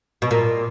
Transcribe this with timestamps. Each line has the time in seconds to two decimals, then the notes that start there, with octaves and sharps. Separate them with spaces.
0.22 B2
0.31 A#2